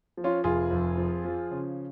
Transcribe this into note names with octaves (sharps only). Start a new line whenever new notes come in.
F3
C#4 F4
F1 F4 G#4
F2
F3
F3
C#3